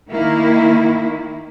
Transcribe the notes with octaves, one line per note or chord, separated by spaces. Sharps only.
D#3 A#3 E4